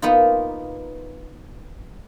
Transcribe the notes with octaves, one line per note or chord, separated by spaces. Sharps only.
A#3 B3 D#4 F4